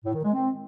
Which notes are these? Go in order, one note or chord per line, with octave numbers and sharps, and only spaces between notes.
A2
D#3
G#3
C4